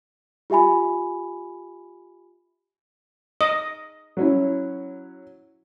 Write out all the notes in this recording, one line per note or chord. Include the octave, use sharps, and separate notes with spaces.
F4 G4 E5 G#5 B5
D#5
F#3 C#4 E4